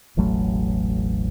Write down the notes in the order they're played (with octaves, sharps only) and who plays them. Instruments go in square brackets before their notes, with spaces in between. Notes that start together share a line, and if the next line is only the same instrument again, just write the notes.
[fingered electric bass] E1 A1 F#3 A3